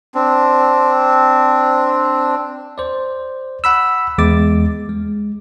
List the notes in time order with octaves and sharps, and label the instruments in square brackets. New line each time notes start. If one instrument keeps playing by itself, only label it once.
[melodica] C4 D4
[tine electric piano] C5 D5
F#5 B5 E6
E2 G#3 D6 A6
G#3